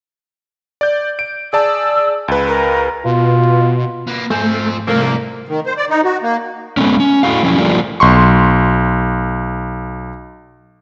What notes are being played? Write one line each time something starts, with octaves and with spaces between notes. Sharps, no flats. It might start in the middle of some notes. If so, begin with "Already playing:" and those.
D5 G6
D7
G#4 D5 A5 E6
C#2 B4
A#4
B2 F4
A#3 B4
G#2 F3 A3 C4 G#5 G6
C2 C3 F3 A3 A#3
D#3
C5
D5
D#4
F#4
A#3
G#3 A3 B3 C#4
C#4
A3 E4 F#4 A4 F5
F3 F#3 C#4 E4
F3 G3 A3 A#3 D4 F4
B1 C6 C#6